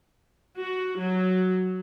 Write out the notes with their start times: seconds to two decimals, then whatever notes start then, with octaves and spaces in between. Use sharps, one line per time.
0.58 F#4
0.98 F#3